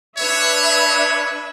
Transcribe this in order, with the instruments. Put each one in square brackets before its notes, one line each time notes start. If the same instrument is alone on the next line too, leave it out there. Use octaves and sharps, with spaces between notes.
[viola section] D4 B4 E5 [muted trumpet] C#5